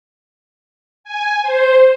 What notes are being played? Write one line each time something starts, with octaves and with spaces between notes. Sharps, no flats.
G#5
C5